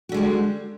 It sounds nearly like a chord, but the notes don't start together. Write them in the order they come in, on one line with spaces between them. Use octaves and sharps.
F#4 D3 G#3 G3